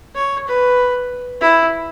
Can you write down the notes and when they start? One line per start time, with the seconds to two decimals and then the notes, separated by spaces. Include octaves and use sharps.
0.15 C#5
0.47 B4
1.41 E4